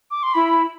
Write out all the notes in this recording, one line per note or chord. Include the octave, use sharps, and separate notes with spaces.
D6
C6
E4 B5